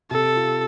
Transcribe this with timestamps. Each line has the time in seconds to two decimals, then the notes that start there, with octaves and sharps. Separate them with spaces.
0.11 C3 A4
0.36 F4